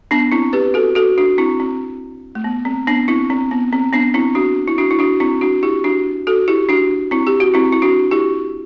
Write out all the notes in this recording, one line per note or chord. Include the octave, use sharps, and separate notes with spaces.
B3 D4
C4 E4
G4 B4
F#4 A4
F#4 A4
D4 F#4
C4 E4
C4
A3
B3
C4
B3 D4
C4 E4
C4
B3
C4
B3 D4
C4 E4
D4 F#4
E4
D4 F#4
E4
D4 F#4
C4 E4
D4 F#4
E4 G4
D4 F#4
F#4 A4
E4 G4
D4 F#4
C4 E4
G4
F#4
C4 E4
E4
D4 F#4
E4 G4